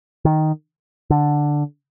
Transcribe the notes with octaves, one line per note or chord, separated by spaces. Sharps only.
D#3
D3